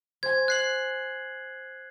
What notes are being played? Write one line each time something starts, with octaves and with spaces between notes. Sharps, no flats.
C5 G#5 G#6
F#6 C7 F#7